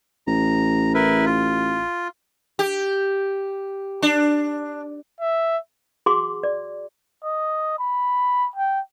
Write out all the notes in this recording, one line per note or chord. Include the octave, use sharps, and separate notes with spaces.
A1 A#5
E4 A#4 B4
F4
G4
D4
E5
F#4 G#4 F#5 C6 D6
D5
D#5
B5
G5